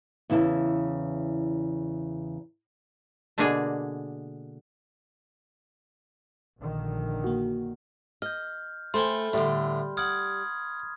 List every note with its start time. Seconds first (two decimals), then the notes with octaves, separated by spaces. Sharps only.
0.30 E2 C#3 E4 A5
3.38 B2 D3 G#3 A#3 D4 G#4
6.59 A#1 D3 D#3
7.24 A#3 F#4
8.22 D#5 F6 G6
8.94 A3 C5 G5 G#5 B5 C6
9.33 A2 D3 G3
9.97 F#5 D6 D#6 F6 G#6